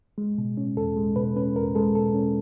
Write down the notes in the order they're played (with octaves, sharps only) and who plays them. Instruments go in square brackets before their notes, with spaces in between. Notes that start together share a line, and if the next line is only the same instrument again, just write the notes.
[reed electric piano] G#3
B2
C#4
E2 A4
G#3
B2 B4
C#4 B4
E2 A#4
G#3 A4
B2 A4
C#4